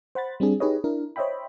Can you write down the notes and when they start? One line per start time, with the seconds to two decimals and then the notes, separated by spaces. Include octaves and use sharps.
0.15 C5 F#5 B5 A6
0.40 G3 C4 D4 G#4
0.60 D#4 G4 G#4 B4 C#5 D#5
0.84 D4 E4 A#4
1.16 C5 C#5 D#5 E5 G5 B5